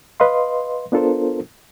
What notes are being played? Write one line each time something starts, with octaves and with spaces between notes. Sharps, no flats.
B4 D#5 F5 C6
B3 D4 F4 A4 A#4 C5